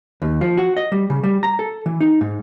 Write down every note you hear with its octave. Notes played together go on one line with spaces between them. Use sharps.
D#2
F3
F#4
D#5
G3
C#3
G3
A#5
A4
E3
D#4
G#2